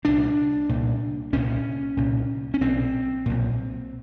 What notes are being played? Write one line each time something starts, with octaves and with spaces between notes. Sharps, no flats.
C2 A#2 D4
C2 A#2
C2 A#2 C#4
C2 A#2
C#4
B1 A#2 C4
B1 A#2